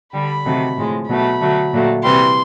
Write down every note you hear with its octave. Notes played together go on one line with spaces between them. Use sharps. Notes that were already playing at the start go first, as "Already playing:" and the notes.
D3 G3 B5
C3 D#3 F#3 A3
A2 F3 G#3
B2 F#3 A3 B5
D3 F#3 A3
A#2 F#3 A3
C3 E3 G3 C6